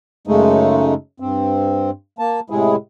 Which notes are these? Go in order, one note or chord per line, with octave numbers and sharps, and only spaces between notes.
F#2 C#3 G#3 A3 D#4
G2 C4
A#3 A5
A2 C3 G#3 E4 G#4